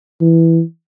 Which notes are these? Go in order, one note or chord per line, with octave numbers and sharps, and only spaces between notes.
E3